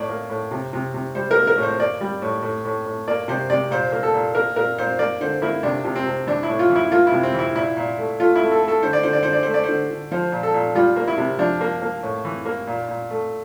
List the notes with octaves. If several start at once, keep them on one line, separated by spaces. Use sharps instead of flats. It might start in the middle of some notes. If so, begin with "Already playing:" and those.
Already playing: A2 D5
A#3
A2
C3
C3
C3
G3 C5
A#4
A#3
A#4
A2
C5
A#3 D5
G3
A2
A2
A2
A2
A#3 D5
C3 C5
C3 D5
A#2 C5
A#3
A4
A#2
A#3 A#4
A#2 A#4
A#2 C5
A#3 D5
D3 C5
A#3 E4
C3 D4
C3
C4
C3
E3 D4
E4
A2
F4
E3
E4
A#3 F4
E4
C3
C4
E3 E4
A#2 E4
A#2
A3
A3 F4
E4
A3
A4
A3
A4
D3 C5
D5
D3 C5
D5
D3 C5
D5
A3 C5
D5
D3 C5
D3
F3 C5
A#2
A4
A#2
G3 F4
A#3
E4
C3
F3 D4
A#3
A#3
A2
E3
A#3
A#2
A#2
A3